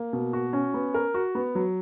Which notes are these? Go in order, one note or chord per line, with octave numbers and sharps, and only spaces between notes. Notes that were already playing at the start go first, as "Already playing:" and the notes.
Already playing: A#3
B2
F#4
C#4
B3
A#4
F#4
B3
F#3